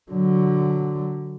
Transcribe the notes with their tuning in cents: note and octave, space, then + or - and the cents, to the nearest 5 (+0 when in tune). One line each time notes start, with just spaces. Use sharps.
D3 +0 F#3 +0